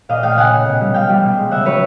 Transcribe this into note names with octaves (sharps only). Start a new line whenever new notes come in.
A#2 D#5 F5
A3 F5 G5
C#3 F#5 G#5
C#3
B2
G3
G3 F5 G5
G3
B2
G#3
C#3 E5 F#5
F#3 B4 C#5